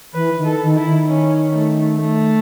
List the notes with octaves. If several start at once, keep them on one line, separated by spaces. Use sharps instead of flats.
E3 B4
D#3
A4
D#3
E4
D#3
C#4
A3
A3